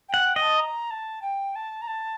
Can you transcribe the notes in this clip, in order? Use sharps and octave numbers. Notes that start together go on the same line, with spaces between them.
F#5 G5
G5
D#5
A5
A#5
A5
G5
A5
A#5
A5